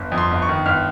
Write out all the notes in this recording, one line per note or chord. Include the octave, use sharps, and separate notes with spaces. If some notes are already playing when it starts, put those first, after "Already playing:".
Already playing: G1
F2
C6
G1
C#6
D#3
G1 F6